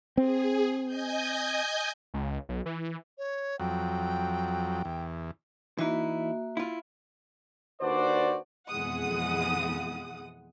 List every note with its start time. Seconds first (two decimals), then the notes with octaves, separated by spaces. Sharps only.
0.17 C4 G#4
0.85 D#5 G#5 G6
2.14 C#2
2.49 B1
2.66 E3
3.18 C#5
3.60 F2 F#3 G5
4.85 E2
5.79 E3 A#3 D#4 E4 F#4 E5
6.57 E4 F4
7.80 D#2 D4 F#4 B4 C5 D5
8.69 F2 B2 E3 G#3 F#5 D#6